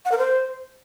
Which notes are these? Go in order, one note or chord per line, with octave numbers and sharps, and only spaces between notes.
F#5
A#4
C5